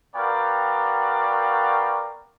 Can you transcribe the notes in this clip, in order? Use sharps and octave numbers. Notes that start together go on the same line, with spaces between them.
B3 F#4 A#4 D5 F5 G5